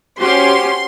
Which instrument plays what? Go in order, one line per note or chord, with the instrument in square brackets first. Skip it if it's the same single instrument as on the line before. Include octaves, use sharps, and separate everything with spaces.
[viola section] C#4 G4 [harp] F#4 C5 F#5 [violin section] C6